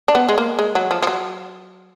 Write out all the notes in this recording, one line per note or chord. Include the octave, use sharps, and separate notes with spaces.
D4
B3
G#3
A#3
G#3
F#3
F3
F3
F#3